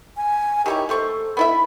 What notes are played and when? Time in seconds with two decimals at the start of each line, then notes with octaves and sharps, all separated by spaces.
0.17 G#5
0.66 D#3 E4 G4 C#5
0.89 A3 A4 C5 C#6
1.37 B3 E4 E5 B5